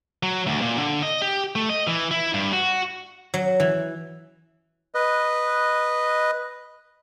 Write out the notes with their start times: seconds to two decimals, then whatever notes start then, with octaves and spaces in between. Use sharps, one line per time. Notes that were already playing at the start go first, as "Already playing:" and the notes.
0.23 F#3
0.47 D2
0.61 A#2
0.78 D3
1.02 D#5
1.22 G4
1.56 A3
1.69 D#5
1.87 E3
2.11 E4
2.34 G2
2.53 F#4
3.34 F#3
3.60 E3
4.95 B4 D#5